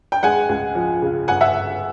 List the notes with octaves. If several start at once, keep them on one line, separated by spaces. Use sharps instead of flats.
G5
G#3 F#5 G#5
C#2
F3
C#3
G1 F#5 G#5
E5 F#5